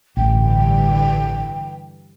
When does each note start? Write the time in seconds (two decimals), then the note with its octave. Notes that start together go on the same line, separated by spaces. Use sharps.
0.17 A1 G2 D3 E3 G5